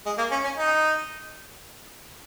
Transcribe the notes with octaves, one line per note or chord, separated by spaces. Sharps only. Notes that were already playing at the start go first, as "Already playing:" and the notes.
G#3
A#3
C#4
C#4
D#4